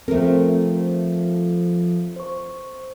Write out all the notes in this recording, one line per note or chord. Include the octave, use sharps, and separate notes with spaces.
F3 A3 C4 A4 A#4
C5 C#6